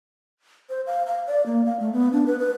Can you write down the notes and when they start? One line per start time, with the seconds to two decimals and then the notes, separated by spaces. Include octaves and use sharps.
0.70 C5
0.87 F5
1.07 F5
1.27 D5
1.46 A#3
1.66 F5
1.80 A3
1.93 B3
2.13 D4
2.26 B4
2.39 B4